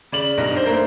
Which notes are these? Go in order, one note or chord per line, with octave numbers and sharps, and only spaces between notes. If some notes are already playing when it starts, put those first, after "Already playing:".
C#3 D5 F#7
B1 G2 D#4 A#6
D4 C5
A3 A#3 A#4 C5